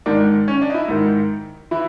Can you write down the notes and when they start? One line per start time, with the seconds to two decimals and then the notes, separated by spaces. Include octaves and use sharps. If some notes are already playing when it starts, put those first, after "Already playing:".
0.06 G#2 D#3 D4
0.48 C#4
0.62 D4
0.70 D#4
0.74 E4
0.88 G#2 D#3
1.71 E3 E4